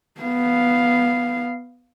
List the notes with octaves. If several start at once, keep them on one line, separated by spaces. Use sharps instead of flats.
B3 F5